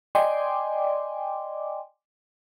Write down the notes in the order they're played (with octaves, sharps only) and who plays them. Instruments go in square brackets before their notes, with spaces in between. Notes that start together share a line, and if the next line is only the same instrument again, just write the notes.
[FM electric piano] D5 D#5 G5 G#5 C6 D6